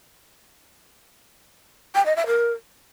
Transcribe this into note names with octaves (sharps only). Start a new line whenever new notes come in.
G5
D#5
E5
A#4